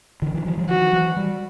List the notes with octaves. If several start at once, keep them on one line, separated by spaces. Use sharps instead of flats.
D3 E3
D#3 F3
E3 F#3
F3 G3
D#3 F3 F#4
E3 F#3
G3